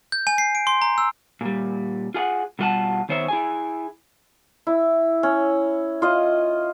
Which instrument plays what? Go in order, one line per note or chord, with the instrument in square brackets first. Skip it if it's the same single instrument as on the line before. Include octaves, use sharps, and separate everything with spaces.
[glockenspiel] G6
G#5
C7
D7
C6
A#5
E6
[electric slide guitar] A#2 G3
F4 G#4 F5 F#5
B2 G3 F4 F#5 A5
D#3 B3 C5 C#5 E5
E4 G#4 G#5
[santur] E4
C#4
F4 D#5